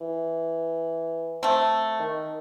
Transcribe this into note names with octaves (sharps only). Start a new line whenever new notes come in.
E3
A3 C4
D#3